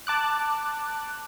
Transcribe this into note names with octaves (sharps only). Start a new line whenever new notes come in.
A5 D6 F#6